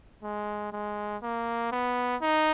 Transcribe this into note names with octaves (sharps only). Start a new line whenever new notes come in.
G#3
G#3
A#3
B3
D#4